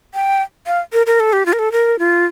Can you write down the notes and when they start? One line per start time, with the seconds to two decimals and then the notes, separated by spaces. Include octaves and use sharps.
0.14 G5
0.67 F5
0.93 A#4
1.06 A#4
1.20 A4
1.33 G4
1.46 F4
1.53 A#4
1.59 A4
1.72 A#4
1.99 F4